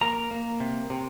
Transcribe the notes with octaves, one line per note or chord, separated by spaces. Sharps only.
A#3 A#4 A#5
A#3
C3
C3